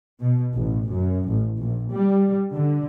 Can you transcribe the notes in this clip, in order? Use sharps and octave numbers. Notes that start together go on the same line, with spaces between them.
B2
A1
F#2
A1
A#1
G3
D3